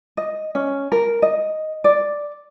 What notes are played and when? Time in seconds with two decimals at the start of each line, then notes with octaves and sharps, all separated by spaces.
0.17 D#5
0.55 C#4
0.92 A#4
1.22 D#5
1.84 D5